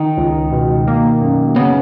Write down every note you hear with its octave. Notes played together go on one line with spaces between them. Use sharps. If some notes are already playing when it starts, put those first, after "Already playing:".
Already playing: D#3
C#2
B2
A#3
F#2
C#3 B3